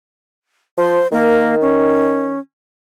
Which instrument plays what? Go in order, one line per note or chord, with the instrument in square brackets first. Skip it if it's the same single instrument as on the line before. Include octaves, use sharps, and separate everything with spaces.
[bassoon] F3 [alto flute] C5
[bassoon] D#3 [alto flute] A#3
[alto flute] C#4